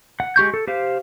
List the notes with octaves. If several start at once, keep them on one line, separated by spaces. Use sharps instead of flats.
F#5
G#3 G4 C#6 G6
A4
G4 C5 F5